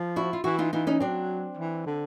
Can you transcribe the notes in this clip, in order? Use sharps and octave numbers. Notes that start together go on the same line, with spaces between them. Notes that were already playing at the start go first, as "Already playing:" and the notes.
Already playing: F3
E4 F#4
F4
E3 E4 F#4
D#4 F4
E3 D#4 F4
C#4 D#4
F#3 C4 D4
E3
D3